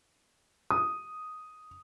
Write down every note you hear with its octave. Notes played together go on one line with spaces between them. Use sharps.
D#6